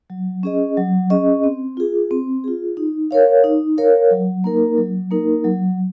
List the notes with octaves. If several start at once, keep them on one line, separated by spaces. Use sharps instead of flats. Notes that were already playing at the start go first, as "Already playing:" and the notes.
F#3
C#4 G#4 D#5
F#3
C#4 G#4 D#5
C4
F4 G#4
C4
F4 G#4
D#4
A#4 C#5 F5
D#4
A#4 C#5 F5
F#3
A#3 D#4 A#4
F#3
A#3 D#4 A#4
F#3